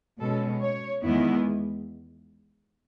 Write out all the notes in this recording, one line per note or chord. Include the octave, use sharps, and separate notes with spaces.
B2 G#3 C#4 A4
C#5
E2 D#3 G#3 B3 E4